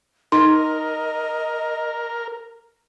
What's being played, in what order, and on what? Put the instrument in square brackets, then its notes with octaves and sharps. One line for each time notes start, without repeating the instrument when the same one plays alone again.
[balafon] D#4 C6 [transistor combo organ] A#4 [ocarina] D#5